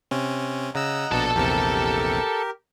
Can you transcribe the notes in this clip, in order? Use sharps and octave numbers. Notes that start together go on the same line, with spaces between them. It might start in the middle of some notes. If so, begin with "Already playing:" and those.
C3 C4 C#4
C#3 D#5 F#5 A#5 E6
A#1 B2 D4 A4 A5
A#1 E2 C3 G4 A#4